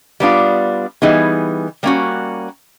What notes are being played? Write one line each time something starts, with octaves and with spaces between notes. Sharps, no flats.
G3 B3 D4 F4
E3 G3 B3 D#4 G#4
G3 A#3 C#4 F#4